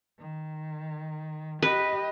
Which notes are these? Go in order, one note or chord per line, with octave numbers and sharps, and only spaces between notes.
D#3
G4 B4 D#5